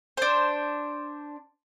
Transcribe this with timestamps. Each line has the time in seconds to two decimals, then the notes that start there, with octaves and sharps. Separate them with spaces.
0.17 D4 C5